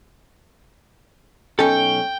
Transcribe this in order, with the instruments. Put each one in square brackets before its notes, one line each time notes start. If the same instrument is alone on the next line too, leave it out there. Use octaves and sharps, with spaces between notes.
[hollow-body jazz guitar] B1 C#4 A4 [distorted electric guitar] G5